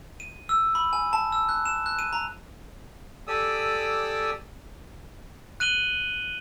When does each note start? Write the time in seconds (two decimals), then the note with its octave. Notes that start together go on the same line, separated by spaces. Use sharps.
0.20 D#7
0.49 E6
0.75 B5
0.93 G#5
1.13 A5
1.32 E6
1.49 F#6
1.66 E7
1.86 F#6
1.99 D#7
2.13 A#5
3.27 G4 A4 D5 G#5 D#6 E6
5.60 F#6 D#7 F#7 G7